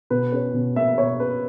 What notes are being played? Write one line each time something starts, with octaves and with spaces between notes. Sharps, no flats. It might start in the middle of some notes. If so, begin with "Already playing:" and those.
B2 B4
C#4
B2
A#3 E5
B2 C#5
C#4 B4